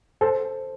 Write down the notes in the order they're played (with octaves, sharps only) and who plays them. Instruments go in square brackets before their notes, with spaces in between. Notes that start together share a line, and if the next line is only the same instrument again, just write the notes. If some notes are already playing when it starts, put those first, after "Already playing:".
[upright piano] A4 C5